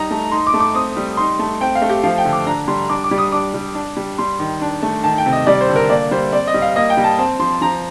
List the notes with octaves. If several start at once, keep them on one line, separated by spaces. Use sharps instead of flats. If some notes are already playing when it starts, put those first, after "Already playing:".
Already playing: G3 D#4 A#5
A3
D#4 C6
D6
A3
D6
C4 D#6
G3
D#4 C6
A3
C4 G5
F5
A3
G4
F3 F5
G5
D3
D6
D4 A#5
G3 C6
D4 D6
D6
G3
D#6
D4 D6
G3
D4
G3
G3 C6
D#3
D4
A3
D#3 A5
G5
C3
D#5
G3 D5
C5
D3
A#4
A#3 D5
G3 C5
C4 D5
D#5
G3
F5
A#3 D#5
G5
G3
A5
C4 A5
F3 C6
F3 A#5